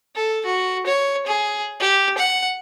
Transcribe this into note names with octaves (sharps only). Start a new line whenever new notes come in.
A4
F#4
C#5
G#4
G4
F#5